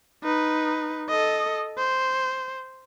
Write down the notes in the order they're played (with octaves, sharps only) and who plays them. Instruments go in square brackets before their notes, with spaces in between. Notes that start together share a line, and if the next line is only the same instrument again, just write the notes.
[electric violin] D#4 B4
A4 D#5
C5